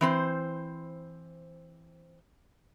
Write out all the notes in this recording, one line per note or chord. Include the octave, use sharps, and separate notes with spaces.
E3 C4 C5